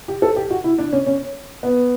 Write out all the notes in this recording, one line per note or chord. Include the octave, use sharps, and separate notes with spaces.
G4
A4
G4
F#4
E4
D4
C#4
C#4
B3